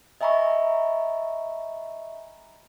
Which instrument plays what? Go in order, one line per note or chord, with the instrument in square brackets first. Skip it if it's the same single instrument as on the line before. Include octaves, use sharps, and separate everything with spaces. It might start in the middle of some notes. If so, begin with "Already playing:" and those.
[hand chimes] D#5 E5 G#5 A#5 B5 C#6